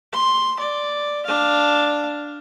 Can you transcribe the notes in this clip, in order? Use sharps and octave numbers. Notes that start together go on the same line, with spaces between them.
C6
D5
D4 F5